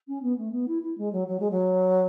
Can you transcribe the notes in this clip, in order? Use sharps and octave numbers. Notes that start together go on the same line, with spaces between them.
C#4
B3
A3
B3
E4
E4
G#3
F#3
F#3
G#3
F#3